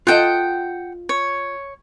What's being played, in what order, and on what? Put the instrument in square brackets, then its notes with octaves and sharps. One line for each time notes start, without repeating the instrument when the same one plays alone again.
[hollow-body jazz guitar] F4 A4 D#5 [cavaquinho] F#5 G5
[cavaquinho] C#5